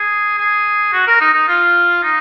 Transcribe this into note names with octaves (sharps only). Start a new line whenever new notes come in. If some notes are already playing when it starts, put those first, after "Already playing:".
Already playing: G#4
G#4
F#4
A#4
D#4
D#4
F4
D#4